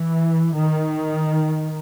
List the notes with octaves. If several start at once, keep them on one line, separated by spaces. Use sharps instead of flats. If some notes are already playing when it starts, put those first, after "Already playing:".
Already playing: E3
D#3